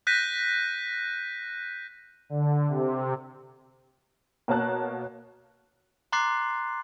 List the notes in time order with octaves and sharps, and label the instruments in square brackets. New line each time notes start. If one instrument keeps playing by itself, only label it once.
[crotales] F#6 G6 A#6 B6 D#7
[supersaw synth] D3
C3
[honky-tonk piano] B2 A#3 A#4 C#5 A5 F#6
[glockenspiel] A#5 C6 D6 F#6 A6 C7